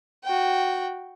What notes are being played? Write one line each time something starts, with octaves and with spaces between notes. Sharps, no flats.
F#4 G5